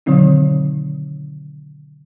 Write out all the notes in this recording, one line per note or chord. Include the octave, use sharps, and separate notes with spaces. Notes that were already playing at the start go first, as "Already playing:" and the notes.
B2 D3 D#3 F#3 C4 D#4